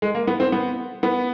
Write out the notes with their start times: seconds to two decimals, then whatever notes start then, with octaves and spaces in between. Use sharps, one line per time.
0.02 G#3
0.15 A#3
0.27 B3
0.40 C4
0.52 B3
1.03 B3